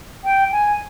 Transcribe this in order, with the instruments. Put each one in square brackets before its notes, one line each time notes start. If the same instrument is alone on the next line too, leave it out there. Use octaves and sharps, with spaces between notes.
[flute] G5
G#5